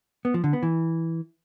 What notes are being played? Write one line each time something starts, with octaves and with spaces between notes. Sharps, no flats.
B3
F3
D3
B3
E3